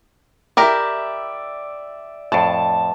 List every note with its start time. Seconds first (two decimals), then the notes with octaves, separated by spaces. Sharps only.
0.57 E4 G4 A#4 D5 E5
2.32 F2 A2 A5